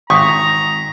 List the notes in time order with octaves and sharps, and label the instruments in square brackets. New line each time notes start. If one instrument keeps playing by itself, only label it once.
[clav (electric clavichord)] G#1 [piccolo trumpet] A#5 [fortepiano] C#6 [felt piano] D#6 B6